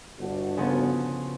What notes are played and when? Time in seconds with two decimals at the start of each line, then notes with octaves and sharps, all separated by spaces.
0.20 G1 D4 F#4
0.57 C#3 F3 B3